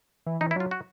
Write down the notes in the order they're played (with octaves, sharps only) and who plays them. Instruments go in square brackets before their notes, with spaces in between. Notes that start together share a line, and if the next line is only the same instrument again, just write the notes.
[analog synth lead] E3
[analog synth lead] E3 [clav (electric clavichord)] D#4
[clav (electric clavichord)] E4
[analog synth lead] F#3 [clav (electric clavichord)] F4
[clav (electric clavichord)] F#4